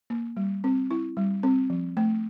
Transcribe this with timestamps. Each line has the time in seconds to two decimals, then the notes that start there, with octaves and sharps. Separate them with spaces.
0.10 A#3
0.37 G3
0.64 C4
0.91 E4
1.17 G3
1.43 C4
1.70 F3
1.97 A3